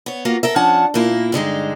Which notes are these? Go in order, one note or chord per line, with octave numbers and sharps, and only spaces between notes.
B3 C#5
A#3 F4 F#4
A4 A#4 E5
F3 C#4 D4 F#5 A5
A#2 A#3 E4
G2 D3 G#3 D#4